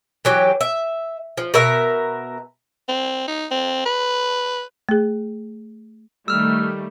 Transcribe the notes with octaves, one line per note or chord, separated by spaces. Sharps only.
E3 F#3 G4
E5
F3
B2 A#4 E5
C4
D#4
C4
B4
A3 G#4
D#3 G3 A3 E6 F6